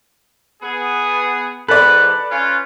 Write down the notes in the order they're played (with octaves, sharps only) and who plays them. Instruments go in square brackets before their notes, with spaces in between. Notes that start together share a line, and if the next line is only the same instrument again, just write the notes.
[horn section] B3 G#4
[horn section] G#2 E3 B3 [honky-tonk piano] A4 D5 [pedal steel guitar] B4
[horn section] C#4 F4